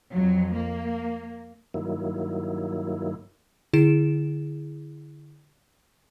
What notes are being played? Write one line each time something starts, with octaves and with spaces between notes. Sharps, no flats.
F2 F#3
A#3
G2 D#3 F#3 A#3 E4
D3 E4 G#4 D7 E7